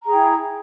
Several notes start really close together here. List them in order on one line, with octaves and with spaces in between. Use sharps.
A#5 G#4 G5 E4